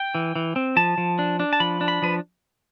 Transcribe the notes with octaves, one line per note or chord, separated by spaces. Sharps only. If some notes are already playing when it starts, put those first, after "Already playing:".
Already playing: G5
E3
E3
C4
F3 A5
F3
D4
D4
A5
F3 B5
D4
B5
F3 B4